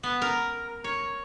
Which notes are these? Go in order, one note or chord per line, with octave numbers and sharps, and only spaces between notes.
B3
A#4
C#5